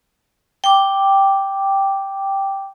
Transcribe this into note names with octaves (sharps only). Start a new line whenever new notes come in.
G5 D6